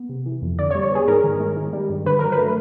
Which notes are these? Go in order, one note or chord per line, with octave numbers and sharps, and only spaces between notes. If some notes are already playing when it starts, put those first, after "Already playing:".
Already playing: B3
C3
E3
F2
D3 D5
C#5
G3
C#5
B3 G#4
G#2 A#4
D#3
G#3
D#3
G3
G2
D3 B4
F#3 A#4
B4
A3